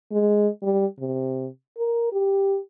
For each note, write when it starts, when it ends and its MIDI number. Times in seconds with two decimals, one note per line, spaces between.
0.12 0.48 56
0.63 0.86 55
0.99 1.48 48
1.78 2.12 70
2.12 2.58 67